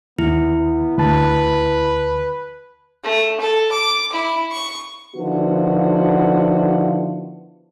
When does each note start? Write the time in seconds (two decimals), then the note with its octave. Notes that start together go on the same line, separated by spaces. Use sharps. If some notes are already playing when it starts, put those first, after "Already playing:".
0.19 D#2 B3 E4
0.60 B3
0.98 D2 B4 A5
3.04 A3
3.41 A4
3.72 D6
4.12 E4
4.52 C#6
5.16 D3 D#3 F3 B3 E4 F#4